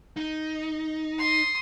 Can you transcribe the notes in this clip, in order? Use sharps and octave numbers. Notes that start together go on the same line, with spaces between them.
D#4
C6 D#6